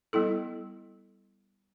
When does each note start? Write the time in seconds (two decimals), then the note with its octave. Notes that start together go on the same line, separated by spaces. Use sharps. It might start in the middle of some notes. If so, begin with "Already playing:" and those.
0.13 G3 B3 E4 A4